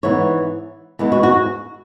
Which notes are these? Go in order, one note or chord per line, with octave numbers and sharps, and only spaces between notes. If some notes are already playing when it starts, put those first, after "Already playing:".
G#2 E3 B3 C#5
E2 E3 G#3 B3
F#4
F#4